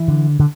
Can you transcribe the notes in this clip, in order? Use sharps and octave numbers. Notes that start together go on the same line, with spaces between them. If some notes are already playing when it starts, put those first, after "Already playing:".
Already playing: E3
D3
D3